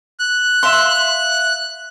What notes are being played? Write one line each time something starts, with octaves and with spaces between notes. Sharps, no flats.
F#6
E5 F5 C6